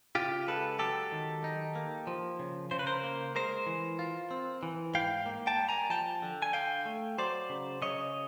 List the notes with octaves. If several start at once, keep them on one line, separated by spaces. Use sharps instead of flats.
C#3 F4 G4
G#3 A4 B4
F#3 G4 A4
D#3
D#4
A#3
F3
C#3
C#3 C5
B4
A#4 C5
A#3
G#3 A#4 C5
E3
F4
C4
E3
G#2 F5 G5
A#3
G5 A5
G3
G#5 A#5
F3 G5 A5
D3
G#5
D3 F5 G5
A3
F#3 C5 D5
C#3
C#3 C#5 D#5